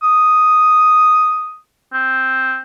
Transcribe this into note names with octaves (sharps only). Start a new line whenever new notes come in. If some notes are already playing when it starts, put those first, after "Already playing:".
D#6
C4